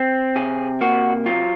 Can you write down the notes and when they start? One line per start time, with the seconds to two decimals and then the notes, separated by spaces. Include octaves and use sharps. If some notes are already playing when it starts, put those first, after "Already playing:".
Already playing: C4
0.36 C3 G#4
0.81 A#3 F#4
1.26 F#3 F4